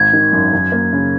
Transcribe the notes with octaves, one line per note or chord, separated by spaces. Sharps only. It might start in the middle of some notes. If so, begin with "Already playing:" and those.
Already playing: G#1 G#6
D#3
F#2
F#2
A#3
C#3